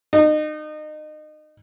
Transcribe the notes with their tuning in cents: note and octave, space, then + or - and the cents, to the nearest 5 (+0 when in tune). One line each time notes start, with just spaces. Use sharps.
D#4 -30